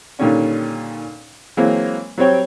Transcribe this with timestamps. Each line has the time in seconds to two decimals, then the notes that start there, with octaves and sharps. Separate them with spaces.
0.19 A#2 D3 D#3 G3 C#4 D4
1.57 E3 F#3 G#3 A#3 C4
2.18 F#3 G3 C4 C#5 G5